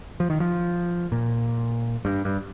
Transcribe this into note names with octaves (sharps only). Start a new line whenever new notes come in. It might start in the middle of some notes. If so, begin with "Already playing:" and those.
F3
D#3
F3
A#2
G2
G2